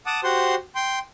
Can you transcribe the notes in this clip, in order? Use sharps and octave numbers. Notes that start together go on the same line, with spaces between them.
F#5 A5 D6 D#6
F#4 G4 C5 F#5 C6
G5 C6